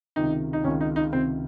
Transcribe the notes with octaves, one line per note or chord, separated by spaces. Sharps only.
C#2 C3 D#3 D#4
D#4
C#2 C3 D#3 C#4
D#4
D#4
C#2 C3 D#3 C4